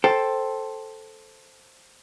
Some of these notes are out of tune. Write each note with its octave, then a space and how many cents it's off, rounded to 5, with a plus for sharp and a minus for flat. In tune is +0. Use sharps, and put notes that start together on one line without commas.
A4 +0 C5 +5 G5 +0